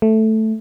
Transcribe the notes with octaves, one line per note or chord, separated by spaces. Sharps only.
A3